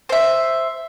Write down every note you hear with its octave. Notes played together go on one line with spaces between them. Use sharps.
C5 E5